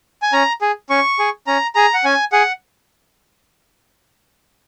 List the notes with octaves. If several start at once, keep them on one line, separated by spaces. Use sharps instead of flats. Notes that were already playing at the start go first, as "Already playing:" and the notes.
G#5
C#4 A#5
G#4
C#4 C#6
G#4
C#4 A#5
G#4 A#5
F#5
C#4 G#5
G#4 F#5